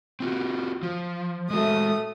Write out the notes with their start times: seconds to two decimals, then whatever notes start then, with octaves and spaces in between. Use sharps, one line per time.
0.20 C4 F4 F#4
0.83 F3
1.51 G#3 A3 F#4 D#6